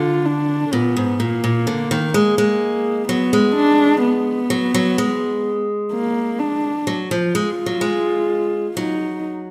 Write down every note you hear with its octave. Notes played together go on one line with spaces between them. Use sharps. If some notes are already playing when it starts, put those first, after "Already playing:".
Already playing: D3 F4
D4
A#2 B3
G#2
A#2 A#3
A#2
D3
D#3
G#3 A#3
G#3
F#3 B3
G#3
D4
B3
F#3
F#3
G#3
A#3
D4
F#3
F3
G#3 F4
F#3
G#3
F#3 D#4